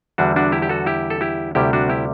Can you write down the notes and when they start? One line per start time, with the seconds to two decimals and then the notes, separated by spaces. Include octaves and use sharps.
0.18 E2 D3 G3 D4 F#4
0.36 D4 F#4
0.52 E4 G4
0.62 G4
0.69 F#4 A4
0.86 E4 G4
1.10 A4
1.21 E4 G4
1.55 D2 C3 G3 E4 G4
1.73 D4 F#4
1.89 E4 G4